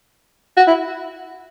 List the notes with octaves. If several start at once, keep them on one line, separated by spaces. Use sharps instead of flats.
F#4
E4